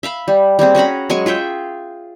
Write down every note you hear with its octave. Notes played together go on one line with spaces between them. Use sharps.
E5 F5 B5
G3
G3 A#3 C4 G#4
C#4 F#4 A#5 B5
F#3 G#3 G#5 C#6
F4 G#4 E5 G5